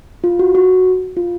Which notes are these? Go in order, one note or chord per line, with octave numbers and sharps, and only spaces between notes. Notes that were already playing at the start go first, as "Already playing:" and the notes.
F4
F#4
F#4
F4